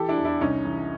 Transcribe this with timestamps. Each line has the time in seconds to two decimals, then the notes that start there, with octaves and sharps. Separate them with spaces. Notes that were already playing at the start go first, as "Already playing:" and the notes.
Already playing: E3 G4 A4
0.08 D4 E4
0.17 E2
0.25 D4 E4
0.41 C2 C#4 D#4
0.65 E3